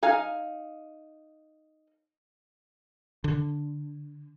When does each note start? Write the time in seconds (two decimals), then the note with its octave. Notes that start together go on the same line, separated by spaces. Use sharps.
0.03 D#4 F5 G#5
3.24 D3